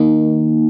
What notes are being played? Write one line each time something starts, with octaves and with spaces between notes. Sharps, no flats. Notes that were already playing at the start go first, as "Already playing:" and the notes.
Already playing: D#3 A#3 D#4